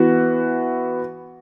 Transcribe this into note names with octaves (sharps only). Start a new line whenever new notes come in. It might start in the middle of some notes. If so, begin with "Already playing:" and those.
Already playing: E3 B3 F#4